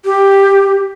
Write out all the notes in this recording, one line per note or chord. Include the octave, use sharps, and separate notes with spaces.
G4